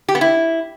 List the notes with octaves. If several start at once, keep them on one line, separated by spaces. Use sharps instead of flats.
G4
B3
E4